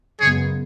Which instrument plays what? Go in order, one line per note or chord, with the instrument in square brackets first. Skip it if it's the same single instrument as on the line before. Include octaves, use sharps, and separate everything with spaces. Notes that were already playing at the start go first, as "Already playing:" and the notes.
[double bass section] F#2 C#3 G#3 B3 [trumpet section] G#4 C#5